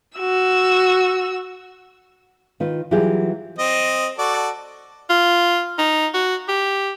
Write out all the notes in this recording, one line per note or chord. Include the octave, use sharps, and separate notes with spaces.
F#4 E6
D#3 F4 B4
E3 F#3 G3 F4 G4 G#4
C4 D#5
F#4 A4 D5
F4
D#4
F#4
G4